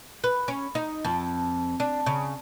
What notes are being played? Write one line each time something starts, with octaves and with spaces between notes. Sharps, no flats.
B4
C#4
D#4
F2
D4
C#3